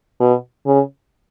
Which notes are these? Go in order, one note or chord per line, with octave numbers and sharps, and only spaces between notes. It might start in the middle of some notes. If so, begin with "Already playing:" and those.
B2
C#3